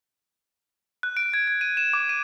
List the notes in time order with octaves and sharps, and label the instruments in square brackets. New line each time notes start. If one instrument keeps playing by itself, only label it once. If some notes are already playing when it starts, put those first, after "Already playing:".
[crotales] F#6
D7
G#6
G#6
D#7
E7
D6
D#7